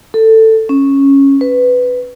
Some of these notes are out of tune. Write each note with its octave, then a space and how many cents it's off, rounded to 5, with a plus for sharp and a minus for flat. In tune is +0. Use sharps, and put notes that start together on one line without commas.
A4 +15
C#4 -10
B4 +10